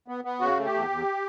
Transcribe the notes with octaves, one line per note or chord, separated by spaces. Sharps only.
B3
B3
C#3 F#4
A3
G4
E2
E2